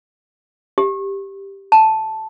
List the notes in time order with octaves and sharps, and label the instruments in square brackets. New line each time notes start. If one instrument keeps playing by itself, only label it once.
[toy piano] G4
A5